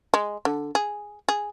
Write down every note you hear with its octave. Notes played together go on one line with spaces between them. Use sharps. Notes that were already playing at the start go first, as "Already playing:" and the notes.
G#3
D3
G#4
G#4